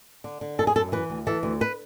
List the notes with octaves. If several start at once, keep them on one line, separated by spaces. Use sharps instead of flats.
D3
D3
F#2 A4
G#4
F#2 A4
E3 B4
D2
E3 A4
D2
B4